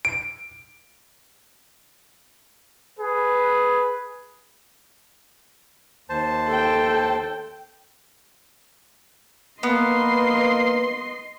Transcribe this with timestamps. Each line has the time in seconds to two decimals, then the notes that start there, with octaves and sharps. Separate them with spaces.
0.05 D7
2.99 G#4 B4
6.09 D#2 C5 A5
6.48 A4 G5
9.63 A#3 B3 B4 D#5 C6